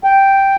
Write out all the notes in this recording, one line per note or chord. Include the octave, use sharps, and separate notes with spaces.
G5